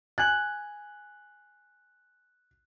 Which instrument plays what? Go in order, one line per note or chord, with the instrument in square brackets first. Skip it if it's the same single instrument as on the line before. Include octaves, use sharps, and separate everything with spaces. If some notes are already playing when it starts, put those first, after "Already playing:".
[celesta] G#5 G#6 A6 [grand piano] F#6 F#7